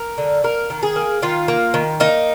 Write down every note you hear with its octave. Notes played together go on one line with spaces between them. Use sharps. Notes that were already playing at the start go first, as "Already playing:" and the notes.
Already playing: A#4
D3
A#3 A#4
D#3
G#4
A#3
D#3 F4
A#3
D#3
A#3 D#4